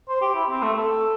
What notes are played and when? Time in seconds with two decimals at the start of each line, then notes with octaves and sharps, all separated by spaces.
0.09 C5
0.21 G4
0.35 E4
0.50 C4
0.62 A3
0.77 A4